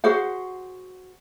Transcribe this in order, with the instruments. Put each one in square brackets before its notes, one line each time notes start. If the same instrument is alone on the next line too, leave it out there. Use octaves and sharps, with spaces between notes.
[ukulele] F#4 G#4 C5 F#5